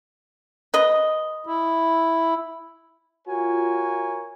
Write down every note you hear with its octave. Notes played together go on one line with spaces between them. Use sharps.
B4 D#5
E4
F4 F#4 A#4 C#5 G#5